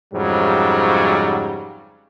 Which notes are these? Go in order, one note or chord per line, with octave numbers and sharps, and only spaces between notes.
F2 G#2 C#3 F#3 G3